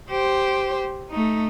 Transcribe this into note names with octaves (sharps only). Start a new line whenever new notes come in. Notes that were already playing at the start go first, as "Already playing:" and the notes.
G4 C5
A3 D#4